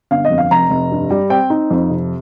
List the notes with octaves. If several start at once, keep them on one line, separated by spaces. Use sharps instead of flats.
G1 F5
D#5
F2
F5
F1 A#5
F1
G2
G3
C4 G5
D#4
F2
C3